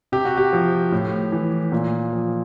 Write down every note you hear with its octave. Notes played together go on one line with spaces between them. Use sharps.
C3 G4
F#4
G4
F3
A2
E3
A#2
F3